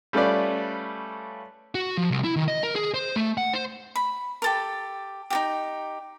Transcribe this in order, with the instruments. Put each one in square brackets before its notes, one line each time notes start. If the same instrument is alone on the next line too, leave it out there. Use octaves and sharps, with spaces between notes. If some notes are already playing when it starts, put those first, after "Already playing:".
[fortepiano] G3 A3 C#4 F4 B4 D5
[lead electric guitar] F#4
F3
C2
E4
D#3
D#5
A#4
G#4
C5
A3
F#5
C5
[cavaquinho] B5
G4 A4 A#4
D#4 F#4 G4